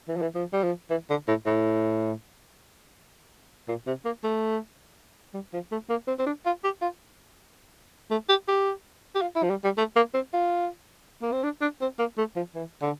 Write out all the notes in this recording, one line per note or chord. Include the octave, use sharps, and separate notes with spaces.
E3
F3
E3
F3
G3
F3
E3
D3
A2
A2
A#2
C3
A#3
A3
G3
F3
A3
A#3
C4
C4
D4
F4
G4
F4
A3
G4
G4
G4
F4
E4
F3
G3
G3
A3
A#3
C4
F4
A#3
C4
D4
D4
C4
A#3
A3
F3
E3
D3